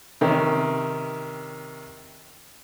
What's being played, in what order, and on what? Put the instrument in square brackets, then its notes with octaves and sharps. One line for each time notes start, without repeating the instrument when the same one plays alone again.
[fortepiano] C3 D#3 C#4